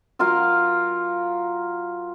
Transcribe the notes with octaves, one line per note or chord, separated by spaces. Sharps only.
F#3 F4 A#4 F5